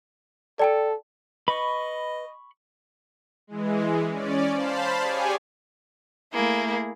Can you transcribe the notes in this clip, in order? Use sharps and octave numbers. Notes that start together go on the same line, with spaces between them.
A4 D5 G5 A5
B4 D#5 B5 C#6
E3 G#3
C#4 D5
C5 F5 A5 B5
G4 G#4 C#5 D5 G#5
A3 A#3 E4 G#4